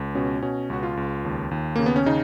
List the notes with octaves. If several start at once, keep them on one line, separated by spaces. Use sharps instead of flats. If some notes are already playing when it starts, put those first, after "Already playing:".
Already playing: C#2
B2 C#4
B2 C#4
C#2 F#4
F4
C#2
D#2
D#2
C#3 A#3
B3
C#4
C#3 D#4